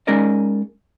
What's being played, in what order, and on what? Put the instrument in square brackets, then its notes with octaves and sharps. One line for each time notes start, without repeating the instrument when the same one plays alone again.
[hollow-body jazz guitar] G#3 C#4 D#4 A#4 D5 D#5